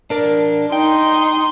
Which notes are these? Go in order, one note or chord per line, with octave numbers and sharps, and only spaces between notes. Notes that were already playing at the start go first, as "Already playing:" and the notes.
D4 A#4 D5
D#4 G5 C6